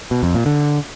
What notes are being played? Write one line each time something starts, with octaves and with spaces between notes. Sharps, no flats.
B2
F2
A#2
D3